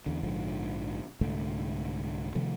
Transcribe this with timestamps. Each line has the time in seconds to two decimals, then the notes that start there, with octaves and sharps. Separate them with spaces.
0.06 E2 D3
0.23 A#1 G#2 D3 F3
1.21 C2 G#2 D3 A3
2.35 C3 D#3 F3 A3